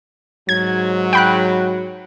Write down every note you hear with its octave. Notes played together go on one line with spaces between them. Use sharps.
G#2 F#3 G#6
G5 B5 F#6